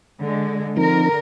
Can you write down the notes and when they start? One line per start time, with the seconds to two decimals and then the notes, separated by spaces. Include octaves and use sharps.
0.20 D3 G#3
0.77 D3 F3 C4 D#4 A#4